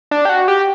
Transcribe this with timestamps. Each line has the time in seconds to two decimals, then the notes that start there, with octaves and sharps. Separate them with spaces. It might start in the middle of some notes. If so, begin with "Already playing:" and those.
0.11 D4
0.25 G4
0.29 F#4
0.48 G4